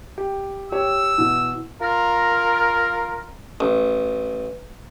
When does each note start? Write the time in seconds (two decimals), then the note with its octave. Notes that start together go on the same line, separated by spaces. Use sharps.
0.18 G4
0.72 G4 C#5 E6
1.18 B2 E3
1.81 F4 A#4
3.60 A1